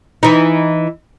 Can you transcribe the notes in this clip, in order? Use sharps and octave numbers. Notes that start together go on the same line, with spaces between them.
E3 D#4